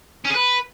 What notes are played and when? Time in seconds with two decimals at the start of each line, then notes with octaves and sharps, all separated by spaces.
0.25 C#4
0.30 G#4
0.35 B4